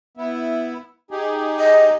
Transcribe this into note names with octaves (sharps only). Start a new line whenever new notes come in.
B3 E4
D#4 G4 G#4
D#5